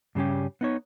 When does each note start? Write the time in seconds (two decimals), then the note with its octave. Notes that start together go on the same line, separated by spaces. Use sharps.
0.15 G2 C#3 G3 C#4 G4
0.61 B3 D#4 C#5